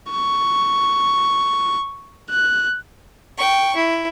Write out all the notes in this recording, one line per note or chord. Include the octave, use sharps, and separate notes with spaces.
C#6
F#6
G5 C#6
E4